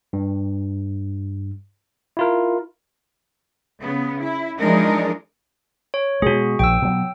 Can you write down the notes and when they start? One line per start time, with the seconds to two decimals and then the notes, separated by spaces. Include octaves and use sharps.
0.13 G2
2.17 E4 F4 A#4
3.82 C#3 B3
4.20 E4
4.59 E3 F3 G#3 D4 D#4 A#4
5.94 C#5
6.22 B2 G#3 F#4 G#4
6.59 A#1 G5 E6
6.82 B2 F#3